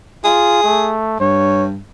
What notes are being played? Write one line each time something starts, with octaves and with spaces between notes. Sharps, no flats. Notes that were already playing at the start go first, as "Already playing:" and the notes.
F4 G#4
A3
G2 C#5